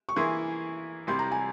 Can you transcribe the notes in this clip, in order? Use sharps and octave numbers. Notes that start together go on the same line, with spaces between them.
C#6
E3 A#3 E4 G#4 C6
C2 C3 G3 C6
A#5
G#5